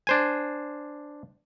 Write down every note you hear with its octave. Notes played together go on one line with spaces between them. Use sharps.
D4 C5 G#5